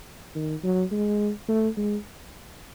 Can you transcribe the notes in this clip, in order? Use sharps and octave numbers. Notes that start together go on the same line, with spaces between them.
D#3
F#3
G#3
A3
G#3